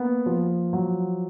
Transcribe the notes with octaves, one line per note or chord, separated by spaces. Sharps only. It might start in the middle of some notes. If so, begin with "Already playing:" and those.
Already playing: A#3 B3
F3
F#3